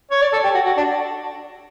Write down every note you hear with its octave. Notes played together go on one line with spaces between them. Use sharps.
C#5
D5
A4
G4
F#4
F#4
D4